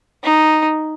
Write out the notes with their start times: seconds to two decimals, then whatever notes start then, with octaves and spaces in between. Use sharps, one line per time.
0.24 D#4